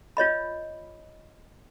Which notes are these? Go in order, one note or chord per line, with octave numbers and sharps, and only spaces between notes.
F4 C#5 D#5 B5